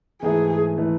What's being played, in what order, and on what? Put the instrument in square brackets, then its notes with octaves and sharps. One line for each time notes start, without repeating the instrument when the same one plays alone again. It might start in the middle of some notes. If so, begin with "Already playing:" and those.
[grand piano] G#2 E3 A3 [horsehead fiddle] G#4
[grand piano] E3 A3